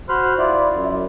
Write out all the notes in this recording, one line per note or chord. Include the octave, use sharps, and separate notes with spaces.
F#4 C5 B5 C6 F6 F#6
E4 F4 D5
F#2